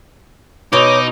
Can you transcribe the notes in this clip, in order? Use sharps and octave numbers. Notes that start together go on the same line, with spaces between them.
B2 D#4 C#5 D6